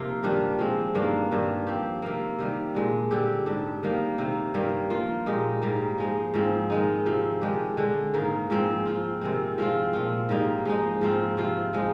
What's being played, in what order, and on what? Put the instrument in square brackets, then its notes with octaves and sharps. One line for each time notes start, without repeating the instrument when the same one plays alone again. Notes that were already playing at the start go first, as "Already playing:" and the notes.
Already playing: [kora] C3 F3 A#3 D#4 F4
G2 D#3 G3 D4
F3 G#3 C4
G2 D#3 A#3 D4
G2 D#3 G3 D4
F3 C4 G4
C3 D#3 A#3
C3 D#3 G3
A#2 G#3 D4
D3 G3 C4 G4
G#2 G3 D4
D#3 G3 A#3 D#4
C3 D#3 A#3
G2 D#3 G3 A#3
F3 A#3 F4
A#2 G#3 D#4 G4
G#2 G3 A#3
F3 G#3 D#4
G#2 F3 G#3 C4
D#3 G#3 D#4
C3 F3 C4
D#3 G#3 D4 G4
D3 G#3 D4
G#2 D#3 A#3 D#4
G#2 F3 G#3 C4
F3 C4 F4
C3 D#3 G#3 C4
F3 G#3 C4 F4
A#2 F3 C4 F4
G#2 G3 A#3 D#4
F3 G#3 D#4
G#2 F3 C4 F4
C3 F3 C4 F4
F3 G#3 D#4